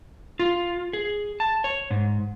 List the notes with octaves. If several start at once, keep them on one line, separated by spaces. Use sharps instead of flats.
F4
G#4
A5
C#5
G#2